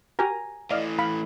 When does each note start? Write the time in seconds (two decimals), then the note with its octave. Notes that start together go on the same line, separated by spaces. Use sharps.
0.19 F#4 G4 A#4 G#5 A#5
0.70 A2 E3 D5 D#5 F5
0.99 F5 B5